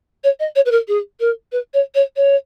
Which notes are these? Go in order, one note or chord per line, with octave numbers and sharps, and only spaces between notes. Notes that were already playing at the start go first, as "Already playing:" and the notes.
C#5
D#5
C#5
B4
A#4
G#4
A#4
B4
C#5
C#5
C#5